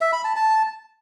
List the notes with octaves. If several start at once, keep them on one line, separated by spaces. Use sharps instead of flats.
E5
B5
A5
A5